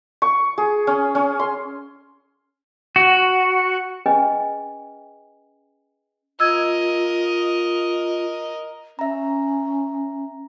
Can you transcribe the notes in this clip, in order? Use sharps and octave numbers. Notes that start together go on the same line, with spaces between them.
C#6
G#4
C#4
C#4
C6
F#4
C#4 G#4 B4 D#5 G5 G#5
F4 A#4 D#5 E6 G#6
C#4 E5 A#5